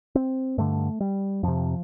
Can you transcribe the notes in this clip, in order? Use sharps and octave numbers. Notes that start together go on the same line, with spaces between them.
C4
G2 D3 A3
G3
F2 C3 F3